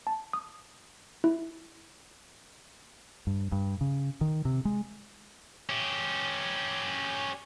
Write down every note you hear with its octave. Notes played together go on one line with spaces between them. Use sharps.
A5
D#6
E4
G2
G2
C#3
D#3
C3
G#3
C#4 G4